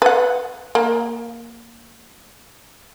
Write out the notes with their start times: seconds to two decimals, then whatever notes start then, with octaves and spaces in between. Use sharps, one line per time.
0.02 B4 F#5
0.75 A#3